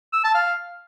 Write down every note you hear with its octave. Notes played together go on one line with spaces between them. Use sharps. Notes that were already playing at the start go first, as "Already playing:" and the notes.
E6
A5
F5